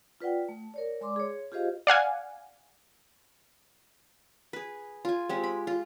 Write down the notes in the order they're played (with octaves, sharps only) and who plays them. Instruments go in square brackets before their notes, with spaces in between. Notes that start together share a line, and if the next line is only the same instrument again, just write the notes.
[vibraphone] F4 B4 D5 F#5 G5
A3
A#4 C#5 D5
G#3 D5 C6 D6
G#4 C#5
F4 G4 G#4 C5 D#5 F5
[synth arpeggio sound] D5 F5 F#5 G#5
[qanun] G#4 B4
F4 G#5
G#3 C4 G4
B5
F4